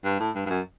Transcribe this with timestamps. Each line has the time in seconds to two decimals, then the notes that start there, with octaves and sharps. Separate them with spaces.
0.04 G2
0.20 A2
0.35 G2
0.46 G2
0.50 F#2